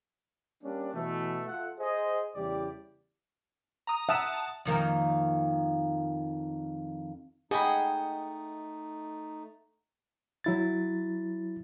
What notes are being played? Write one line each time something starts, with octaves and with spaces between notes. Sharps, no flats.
G3 A#3 C#4 D4
B2 E3 A3
F4 A4 E5 F#5
G#4 C5 D#5
E2 C#3 G3 E4 G4 D5
A#5 D#6
E5 F#5 A5 D#6 E7
F2 D#3 A#3
A3 D#4 G#4 D#5 F#5 G5 B5
F#3 E4 A6